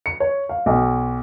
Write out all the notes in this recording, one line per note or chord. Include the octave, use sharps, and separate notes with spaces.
C#7
C#5
F5
B1